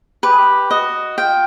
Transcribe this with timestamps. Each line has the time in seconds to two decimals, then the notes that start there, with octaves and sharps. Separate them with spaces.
0.23 G4 B4
0.31 G#4
0.38 G4
0.70 F#4 D#5
1.17 F4 G5